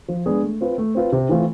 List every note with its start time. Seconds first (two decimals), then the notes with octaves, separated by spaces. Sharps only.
0.08 F3
0.26 G#3 B3 D4 G#4
0.43 A3
0.61 C4 F4 B4
0.78 A3
0.95 C4 F4 B4
1.12 C3
1.29 E3 A3 C4 F4